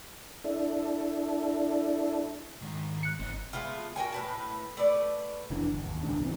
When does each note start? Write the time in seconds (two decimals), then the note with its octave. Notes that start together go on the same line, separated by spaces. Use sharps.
0.44 D4 E4 A4
2.62 G#2 D#3
3.03 F#6 C#7
3.19 G1 C4 D#4
3.53 G#3 A3 B3 F4
3.96 F#4 A#4 G5 G#5
4.12 A2 B4 A5
4.77 A3 B4 D5
5.50 F1 E3 D4
5.72 G1
5.86 D#2
6.03 G#1 C#2 A#2 D4
6.21 E3 A#3 C4